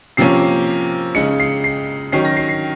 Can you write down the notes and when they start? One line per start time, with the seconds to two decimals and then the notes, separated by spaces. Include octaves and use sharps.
0.17 C3 F3 A#3 C#4 C7
1.15 C#3 G#3 D#4 C#7
1.40 C7
1.64 C7
2.12 D#3 F#3 C#4 C7
2.25 A#6
2.37 C7
2.49 C7